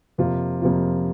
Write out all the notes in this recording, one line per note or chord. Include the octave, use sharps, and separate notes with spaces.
F2 C3 A#3 F4
F2 C3 A#3 F4